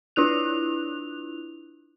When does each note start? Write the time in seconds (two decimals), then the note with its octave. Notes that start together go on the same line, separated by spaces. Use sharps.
0.16 D4 E4 F4 F#6 F7